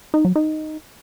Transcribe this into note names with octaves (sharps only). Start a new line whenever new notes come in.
D#4
F#3
D#4